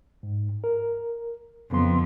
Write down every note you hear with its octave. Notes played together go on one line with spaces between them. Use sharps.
G#2
A#4
F2 C#3 B3 C6